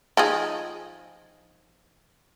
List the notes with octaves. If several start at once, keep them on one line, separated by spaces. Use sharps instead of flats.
F3 D#4 G#4